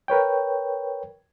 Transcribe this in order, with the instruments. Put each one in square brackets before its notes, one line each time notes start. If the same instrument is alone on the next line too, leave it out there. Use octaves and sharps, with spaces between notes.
[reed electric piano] A#4 B4 C#5 G5